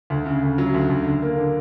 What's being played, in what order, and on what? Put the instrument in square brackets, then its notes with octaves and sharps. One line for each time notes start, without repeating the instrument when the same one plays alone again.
[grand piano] D2
C#3
D2
F#3
D2
D2
D3
A#3
D3